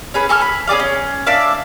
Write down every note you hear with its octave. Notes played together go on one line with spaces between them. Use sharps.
C#4 G#4 B4
A4 G#5 C#6 F6
B5
C#4 G#4 D5 F5
C#4
D4 D5 E5 F5